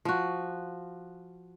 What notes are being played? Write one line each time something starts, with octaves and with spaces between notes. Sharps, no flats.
F3 F#4